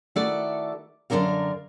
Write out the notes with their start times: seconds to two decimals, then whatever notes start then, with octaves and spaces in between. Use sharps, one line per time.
0.16 D#3 A3 E4 F#4 A4 D5
1.10 F#2 D3 D#3 D4 A#4 F5